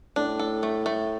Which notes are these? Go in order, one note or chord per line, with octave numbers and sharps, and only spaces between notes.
A2 D4
A4
A3
A3